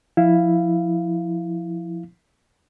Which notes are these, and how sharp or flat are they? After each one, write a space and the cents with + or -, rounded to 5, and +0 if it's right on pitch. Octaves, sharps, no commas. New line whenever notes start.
F3 +0 E4 +0 F5 -10